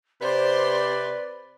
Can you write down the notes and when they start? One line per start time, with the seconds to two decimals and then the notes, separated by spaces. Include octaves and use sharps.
0.21 C3 B4 C5 D5 C6